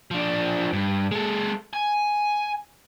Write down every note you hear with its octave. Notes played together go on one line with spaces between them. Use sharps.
F3 D4
G2
G#3 A4
G#5